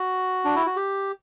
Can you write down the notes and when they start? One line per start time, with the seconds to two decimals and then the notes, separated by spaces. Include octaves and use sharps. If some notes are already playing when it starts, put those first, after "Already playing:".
Already playing: F#4
0.45 D4
0.56 E4
0.66 F#4
0.76 G4